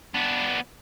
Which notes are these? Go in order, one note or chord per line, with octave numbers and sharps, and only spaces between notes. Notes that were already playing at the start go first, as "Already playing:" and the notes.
B3 D4